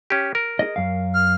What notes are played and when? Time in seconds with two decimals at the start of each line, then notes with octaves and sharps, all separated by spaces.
0.10 C#4 G4
0.35 A#4
0.59 G#4 D#5
0.76 F#2 F5
1.14 F6